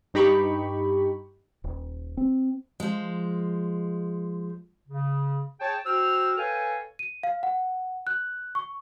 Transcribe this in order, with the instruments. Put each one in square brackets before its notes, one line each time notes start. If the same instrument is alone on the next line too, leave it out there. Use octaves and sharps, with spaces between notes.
[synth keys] G2 D#4 G4 B5 C#6
[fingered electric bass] D#1
C4
[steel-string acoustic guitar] F3 G#3
[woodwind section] C#3
G#4 C#5 G5 A5
F#4 C5 G5 E6 F6
A4 B4 C#5 F5 G5 G#5
[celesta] D#7
F5
F#5
F#6
C#6